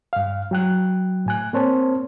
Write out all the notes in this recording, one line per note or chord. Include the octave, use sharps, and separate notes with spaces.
G2 F5
F#3 G5 F#6
A2 G#5 F#6
A#3 C4 C5 C#5 A5